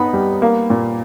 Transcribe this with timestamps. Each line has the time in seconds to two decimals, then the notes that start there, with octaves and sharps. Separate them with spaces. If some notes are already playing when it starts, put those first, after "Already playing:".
Already playing: B3 D#4 B5
0.13 G3
0.42 A#3
0.70 A#2